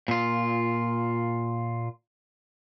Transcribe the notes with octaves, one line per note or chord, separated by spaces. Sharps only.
A#2 F4